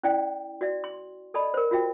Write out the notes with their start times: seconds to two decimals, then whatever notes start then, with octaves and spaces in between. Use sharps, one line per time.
0.03 C#4 E4 D5 F5 G5
0.61 F#4 D5 E5
0.84 C6
1.34 A4 D5 D#5 A5 B5
1.54 A#4 C5
1.71 F4 F#4 E5 G5